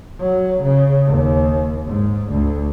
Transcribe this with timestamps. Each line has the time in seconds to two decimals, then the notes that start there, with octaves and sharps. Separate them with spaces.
0.20 F#3
0.63 C#3
1.07 D#2
1.87 G#2
2.31 D2